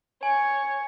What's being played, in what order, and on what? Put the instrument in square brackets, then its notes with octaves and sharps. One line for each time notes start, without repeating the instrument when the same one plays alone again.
[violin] C#5 [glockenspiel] G#5